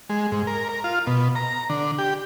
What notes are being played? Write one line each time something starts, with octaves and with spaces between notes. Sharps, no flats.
G#3
G#2
A#4
A#4
F4
B2
A#5
D3
G4